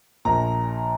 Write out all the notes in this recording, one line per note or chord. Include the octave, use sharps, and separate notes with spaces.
A#1 A#2 A#5